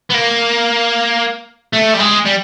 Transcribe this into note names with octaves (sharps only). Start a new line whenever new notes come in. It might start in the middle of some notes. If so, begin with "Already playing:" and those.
B3
A#3
A3
G3
G#3
G3